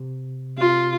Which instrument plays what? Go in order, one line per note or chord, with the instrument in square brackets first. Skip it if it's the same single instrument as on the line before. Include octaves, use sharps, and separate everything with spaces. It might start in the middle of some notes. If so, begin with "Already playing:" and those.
Already playing: [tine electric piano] C3
[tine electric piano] C3 [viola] F4